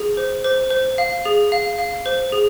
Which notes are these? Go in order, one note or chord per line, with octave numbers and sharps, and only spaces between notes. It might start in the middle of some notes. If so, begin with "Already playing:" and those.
Already playing: G#4
C5
C5
C5
F5
G#4
F5
F5
C5
G#4